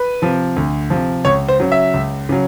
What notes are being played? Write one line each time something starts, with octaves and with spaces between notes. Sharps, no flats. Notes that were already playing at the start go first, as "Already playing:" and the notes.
Already playing: B4
C3 F3
D2
C3 F3
C#2 C#5
C5
C#3 F#3
E5
C#2
C#3 F#3